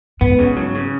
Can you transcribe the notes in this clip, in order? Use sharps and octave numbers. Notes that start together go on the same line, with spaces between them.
G#2 B3
C#3
F#3
C#3